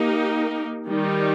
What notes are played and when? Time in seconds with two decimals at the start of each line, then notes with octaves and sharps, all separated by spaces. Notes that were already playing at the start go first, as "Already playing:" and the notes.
Already playing: A#3 D#4 G4 A#4
0.87 D#3 G3 D#4